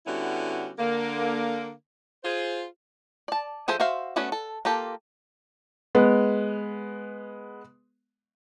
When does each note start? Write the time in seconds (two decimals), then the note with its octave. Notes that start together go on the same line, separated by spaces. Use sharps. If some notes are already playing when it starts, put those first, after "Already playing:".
0.07 D3 G3 B3 C#4 E4 F#4
0.79 D3 A#3
2.24 F4 G#4 C5
3.28 D5 A5
3.68 F3 G#4 A4 C5 E5
3.80 F#4 C5 E5 F5
4.16 A3 B3 C#4 F#4 D5
4.32 A4
4.65 A#3 F4 G4 A4
5.95 G#3 B3